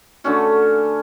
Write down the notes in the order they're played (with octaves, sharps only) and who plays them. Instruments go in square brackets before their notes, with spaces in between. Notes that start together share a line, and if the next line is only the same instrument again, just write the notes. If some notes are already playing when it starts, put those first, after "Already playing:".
[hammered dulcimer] D3 A3 C#4 F#4